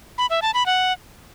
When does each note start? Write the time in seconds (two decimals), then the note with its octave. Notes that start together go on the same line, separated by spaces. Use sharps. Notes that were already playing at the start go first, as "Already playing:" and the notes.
0.18 B5
0.30 E5
0.42 A5
0.54 B5
0.66 F#5